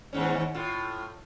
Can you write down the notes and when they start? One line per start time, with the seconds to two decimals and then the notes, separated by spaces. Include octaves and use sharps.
0.13 D#2 G#2 C#4
0.55 A2 F4